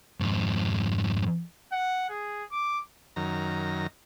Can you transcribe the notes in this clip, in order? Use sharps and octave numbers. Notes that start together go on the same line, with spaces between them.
F2 G#2
F#5
G#4
D6
F#2 D#3 A#5